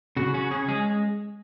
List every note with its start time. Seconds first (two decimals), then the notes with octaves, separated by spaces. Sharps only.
0.17 C#3 F#4
0.34 C#4 F#4
0.51 C#4 G#4
0.68 G#3 G#4